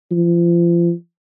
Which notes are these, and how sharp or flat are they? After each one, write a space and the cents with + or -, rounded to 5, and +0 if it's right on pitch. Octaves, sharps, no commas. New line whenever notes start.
F3 -35